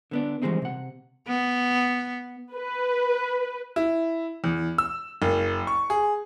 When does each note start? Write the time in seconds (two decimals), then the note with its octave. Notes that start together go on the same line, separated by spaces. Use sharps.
0.11 D3 B3 D4
0.42 E3 F3 G3 G#3 C4 D#4
0.62 C3 F#5
1.27 B3
2.55 B4
3.76 E4
4.44 E2
4.78 E6
5.22 F#1
5.67 C#6
5.90 G#4